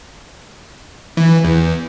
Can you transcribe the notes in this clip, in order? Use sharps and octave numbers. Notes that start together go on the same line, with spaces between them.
E3
E2